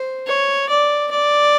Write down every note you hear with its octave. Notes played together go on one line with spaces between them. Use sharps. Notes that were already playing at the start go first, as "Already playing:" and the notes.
Already playing: C5
C#5
D5
D5